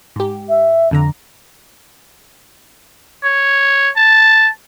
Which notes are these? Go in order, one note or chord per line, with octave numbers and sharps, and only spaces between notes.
G#2 G4
E5
F2 D3 A#5
C#5
A5